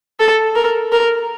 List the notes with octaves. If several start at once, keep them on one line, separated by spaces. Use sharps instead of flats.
A4
A#4
A#4